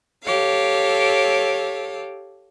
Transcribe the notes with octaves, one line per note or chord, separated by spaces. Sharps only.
G4 A4 C#5 F5